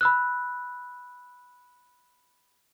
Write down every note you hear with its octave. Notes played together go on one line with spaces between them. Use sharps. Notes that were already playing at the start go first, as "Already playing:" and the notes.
B5 E6 F#6